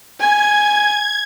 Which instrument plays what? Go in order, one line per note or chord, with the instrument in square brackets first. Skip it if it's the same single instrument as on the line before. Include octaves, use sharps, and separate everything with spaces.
[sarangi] G#5 [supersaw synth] G#6